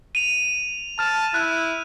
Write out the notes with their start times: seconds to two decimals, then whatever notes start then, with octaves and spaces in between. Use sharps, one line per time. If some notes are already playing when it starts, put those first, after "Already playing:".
0.15 D#7 F7
0.99 A5 F6
1.34 E4 F#6